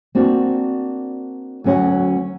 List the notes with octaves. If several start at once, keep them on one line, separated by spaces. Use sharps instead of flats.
A#3 C4 D4 F#4
D2 F#3 C#4 C#5 F#5